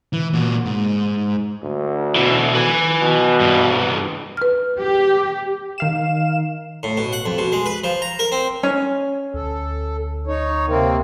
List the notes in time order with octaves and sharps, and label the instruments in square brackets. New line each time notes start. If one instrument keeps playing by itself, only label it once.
[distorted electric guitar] E3
A#2 F#4
G#2
[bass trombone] D2
[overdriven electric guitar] B2 E3
B4 G#5
[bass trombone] B2
[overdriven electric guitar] G2 E3
[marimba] B4 F6
[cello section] G4
[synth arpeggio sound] D#3 F5 E7
[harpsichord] A2
B2
F#5
F2
B2
G#3
B4
F3
A#5
A#4
C4
[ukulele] C#4
[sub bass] D2 [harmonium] A4
[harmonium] D#4 C#5
C3 A#3 C4